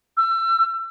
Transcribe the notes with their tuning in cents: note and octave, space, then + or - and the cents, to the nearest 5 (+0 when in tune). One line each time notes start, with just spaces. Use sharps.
E6 +30